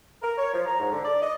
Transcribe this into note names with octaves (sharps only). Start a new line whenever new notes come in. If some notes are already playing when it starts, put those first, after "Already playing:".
A#4
C#5
F3
A#5
G#2
D3
D5
D#5